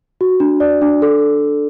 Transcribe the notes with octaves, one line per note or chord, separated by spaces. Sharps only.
F#4
D4
D5
D4
A4